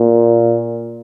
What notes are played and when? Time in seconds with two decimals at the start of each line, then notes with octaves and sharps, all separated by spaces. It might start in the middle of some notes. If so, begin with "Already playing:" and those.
Already playing: A#2